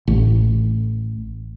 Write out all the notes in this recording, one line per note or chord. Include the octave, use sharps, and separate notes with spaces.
A1